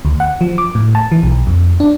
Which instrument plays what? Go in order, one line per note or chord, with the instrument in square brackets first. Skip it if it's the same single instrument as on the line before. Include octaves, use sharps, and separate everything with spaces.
[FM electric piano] D2
F#5
F3
D6
A2
A5
E3
B1
F2
D4